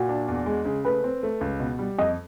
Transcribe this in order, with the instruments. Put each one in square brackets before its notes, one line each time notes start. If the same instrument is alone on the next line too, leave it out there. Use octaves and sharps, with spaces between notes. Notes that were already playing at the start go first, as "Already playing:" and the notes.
Already playing: [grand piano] A#2 [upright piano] F#4
[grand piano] D4
E2
G#3
C#3
[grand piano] A3 [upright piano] B4
[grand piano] C4
A3
C#2
B2
G3
[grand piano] F2 [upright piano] D#5